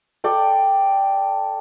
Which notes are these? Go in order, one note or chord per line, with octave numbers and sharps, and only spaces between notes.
A4 D5 G5